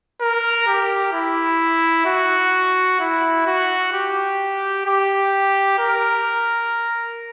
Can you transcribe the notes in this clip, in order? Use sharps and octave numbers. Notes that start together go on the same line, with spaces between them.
A#4
G4
E4
F#4
E4
F#4
G4
G4
A#4